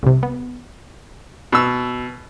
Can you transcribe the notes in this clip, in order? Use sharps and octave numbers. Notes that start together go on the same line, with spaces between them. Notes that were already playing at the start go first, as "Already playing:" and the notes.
C2 C3
B3
B2 E6